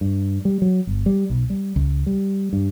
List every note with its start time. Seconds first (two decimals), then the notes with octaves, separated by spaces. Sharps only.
0.01 G2
0.45 G3
0.62 F#3
0.87 G1
1.06 G3
1.30 B1
1.50 G3
1.76 C#2
2.06 G3
2.53 G2